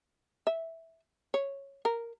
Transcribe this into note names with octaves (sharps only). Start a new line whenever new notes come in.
E5
C#5
A#4